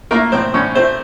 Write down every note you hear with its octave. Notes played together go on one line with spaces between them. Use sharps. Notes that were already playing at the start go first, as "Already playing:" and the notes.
A3 A#3 A#4
A2 C4 C5
A2 C#4 C#5
A3 C4 C5